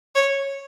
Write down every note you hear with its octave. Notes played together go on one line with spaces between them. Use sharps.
C#5